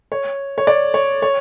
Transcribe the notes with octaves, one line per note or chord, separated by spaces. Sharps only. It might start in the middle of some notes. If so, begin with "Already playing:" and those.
C#5
C#5
D5
C#5
C#5